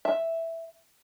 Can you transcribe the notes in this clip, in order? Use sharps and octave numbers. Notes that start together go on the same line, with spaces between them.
E5